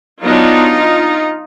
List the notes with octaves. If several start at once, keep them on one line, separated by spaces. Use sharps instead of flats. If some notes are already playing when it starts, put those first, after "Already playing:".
F#3 B3 D4 D#4 F4